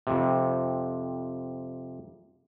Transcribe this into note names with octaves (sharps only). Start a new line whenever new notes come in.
F2 C3